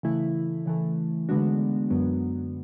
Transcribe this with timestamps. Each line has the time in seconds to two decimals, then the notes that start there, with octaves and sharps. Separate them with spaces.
0.03 C#3 E3 A3 E4
0.66 C#3 E3 A3
1.29 D3 G#3 B3 D4 F#4
1.90 F#2 D3 F#3 B3